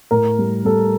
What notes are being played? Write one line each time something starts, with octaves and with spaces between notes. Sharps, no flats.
A2 A#4
G3
G3 A4